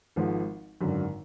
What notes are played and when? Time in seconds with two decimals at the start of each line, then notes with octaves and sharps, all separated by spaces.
0.16 G#1 G#2 F3
0.81 G#1 F#2 D3